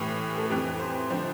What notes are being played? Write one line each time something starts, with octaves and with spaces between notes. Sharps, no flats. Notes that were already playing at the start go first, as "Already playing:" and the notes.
Already playing: A2 E3 G4
A4
F2 E3 G4
C5
D3 F3 C5